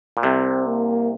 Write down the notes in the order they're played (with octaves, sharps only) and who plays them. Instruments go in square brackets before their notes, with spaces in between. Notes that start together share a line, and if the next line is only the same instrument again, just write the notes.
[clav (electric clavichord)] A#2
[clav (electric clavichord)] C2 C3 [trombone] C4
[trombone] A#3